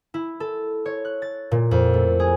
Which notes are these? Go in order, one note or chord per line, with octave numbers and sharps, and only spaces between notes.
E4
A4
C#5
F#6
A6
A#2
F2
A3
G#4